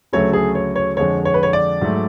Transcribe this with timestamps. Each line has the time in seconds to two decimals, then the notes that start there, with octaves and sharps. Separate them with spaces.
0.13 D2 C#3 F#3 A3 C#5
0.33 G#4
0.55 C#5
0.76 C#5
0.97 F2 D3 G#3 C#5
1.25 C#5
1.34 B4
1.43 C#5
1.53 D5
1.81 G#2 F#3 A3